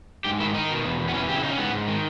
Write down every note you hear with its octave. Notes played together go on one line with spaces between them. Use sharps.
G#2 G4
D#3 E4
D#3 D#4
B2
E2
E2
B3
E3 C#4
C#3 G4
E4
C#3 D#4
C#4
G#2 B3
G#2
D#3